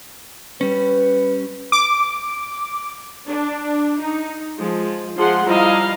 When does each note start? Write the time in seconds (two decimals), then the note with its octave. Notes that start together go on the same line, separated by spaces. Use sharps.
0.61 G3 C#4 B4
1.72 D6
3.26 D4
4.00 D#4
4.58 F3 G#3
5.18 F3 G#3 G#4 F#5 C6
5.47 F3 G3 E4 D#5 F5 A#5